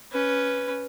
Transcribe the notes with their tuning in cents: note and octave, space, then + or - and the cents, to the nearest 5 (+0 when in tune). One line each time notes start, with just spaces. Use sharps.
C#4 +5 B4 +0